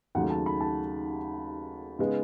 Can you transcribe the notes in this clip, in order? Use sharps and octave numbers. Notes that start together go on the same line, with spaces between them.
D#2 C#3 F#3 A3 F#5
A5
B5
A5
C#3 G#3 B3 D#4